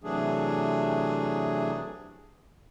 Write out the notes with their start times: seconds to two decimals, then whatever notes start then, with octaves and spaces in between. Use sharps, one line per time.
0.04 C3 E3 F#3 A3 D4 G#4